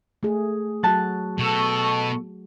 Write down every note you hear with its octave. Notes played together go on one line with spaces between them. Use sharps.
A3 G#4
F#3 F#4 A5 F#6
B2 A4 C#6